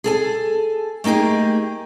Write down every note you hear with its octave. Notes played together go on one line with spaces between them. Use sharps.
G#4 A4 G#5
A3 A#3 D#4 G4 G#4